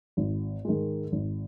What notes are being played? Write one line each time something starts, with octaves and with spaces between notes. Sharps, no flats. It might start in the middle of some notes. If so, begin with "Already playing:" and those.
G#1
G#2 D#3 G#3
G#1